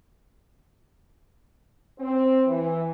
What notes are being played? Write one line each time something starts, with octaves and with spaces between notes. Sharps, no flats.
C4
E3